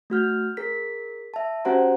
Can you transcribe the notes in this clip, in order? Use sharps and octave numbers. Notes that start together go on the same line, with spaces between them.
A3 F#4 F6 G6
G#4 A#4 B6
E5 A5
C#4 F#4 G4 C5 F#5 A#5